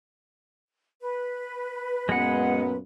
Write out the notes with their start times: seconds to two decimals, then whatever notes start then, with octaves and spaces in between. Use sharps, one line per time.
1.01 B4
2.09 F#2 A#2 G#3 B3 F#5